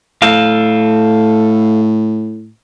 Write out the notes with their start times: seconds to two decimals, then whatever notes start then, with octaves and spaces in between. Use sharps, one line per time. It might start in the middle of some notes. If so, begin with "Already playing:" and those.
0.22 A2 A4 F5